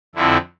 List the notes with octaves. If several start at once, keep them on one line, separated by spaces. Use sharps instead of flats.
F2 D3 F3 C4 E4